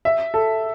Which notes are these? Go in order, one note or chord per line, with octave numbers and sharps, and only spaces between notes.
E5
A4